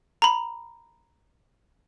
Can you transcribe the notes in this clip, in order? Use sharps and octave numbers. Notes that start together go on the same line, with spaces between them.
A#5 B5